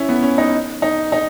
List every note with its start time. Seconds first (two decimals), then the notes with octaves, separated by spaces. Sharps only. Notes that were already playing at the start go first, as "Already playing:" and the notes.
Already playing: C#4 E4
0.09 B3
0.23 C#4
0.38 D#4
0.82 D#4
1.12 D#4